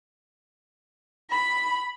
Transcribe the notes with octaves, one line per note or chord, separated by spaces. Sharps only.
B5